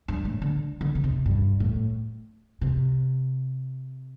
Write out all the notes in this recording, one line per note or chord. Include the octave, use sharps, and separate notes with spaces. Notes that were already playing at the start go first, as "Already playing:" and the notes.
G2
A2
D3
D3
D3
C3
G2
A2
C3